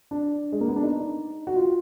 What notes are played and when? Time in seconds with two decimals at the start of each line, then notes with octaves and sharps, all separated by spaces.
0.11 D4
0.52 G#3
0.61 A#3
0.68 B3
0.76 D4
0.83 D#4
1.47 F#4
1.56 F4